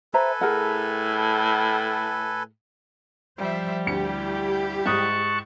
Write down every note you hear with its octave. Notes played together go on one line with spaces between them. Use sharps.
A4 B4 C5 E5 G#5 A#5
A2 G#4 A#4 F#5
F3 G3 C5 E5
D2 E4 G4 C#7
G#2 A5 C#6 D#6 F#6